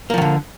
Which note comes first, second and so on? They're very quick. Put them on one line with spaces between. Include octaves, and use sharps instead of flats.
A#3 F3 D#3 D3